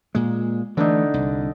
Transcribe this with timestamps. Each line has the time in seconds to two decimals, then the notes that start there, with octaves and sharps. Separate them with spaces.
0.15 A#2 G#3
0.77 D3 E3 A3 D4 D#4
1.14 C2